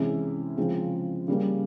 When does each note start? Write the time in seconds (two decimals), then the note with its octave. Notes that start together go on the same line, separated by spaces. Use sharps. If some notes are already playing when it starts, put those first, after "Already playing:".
Already playing: C3 E3 G#3 C#4 E4
0.57 C#3 F3 G#3 C4
1.28 C#3 G3 A#3